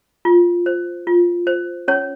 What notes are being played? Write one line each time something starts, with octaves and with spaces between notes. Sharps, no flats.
F4
C5
F4
C5
C#4 C#5